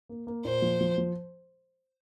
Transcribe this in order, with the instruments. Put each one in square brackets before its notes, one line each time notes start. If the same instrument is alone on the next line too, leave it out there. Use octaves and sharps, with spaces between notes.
[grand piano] A#3
A#3
[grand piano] A#2 [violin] C5
[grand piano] F3
F3
F3